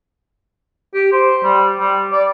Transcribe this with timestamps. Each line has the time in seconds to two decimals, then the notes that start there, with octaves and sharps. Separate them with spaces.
0.94 G4
1.12 C5
1.44 G3
1.79 G3
2.12 D5